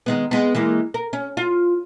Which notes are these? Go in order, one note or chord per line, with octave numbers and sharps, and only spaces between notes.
D#3 G#3 B3
G#3 B3
E3 G#3 A#3
A#4
C#4
F4